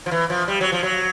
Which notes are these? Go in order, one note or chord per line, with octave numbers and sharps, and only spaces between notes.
F3
E3
F3
G3
F#3
F3
F#3